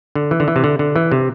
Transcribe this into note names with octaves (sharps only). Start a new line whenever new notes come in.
D3
E3
D3
E3
C3
D3
D3
E3
C3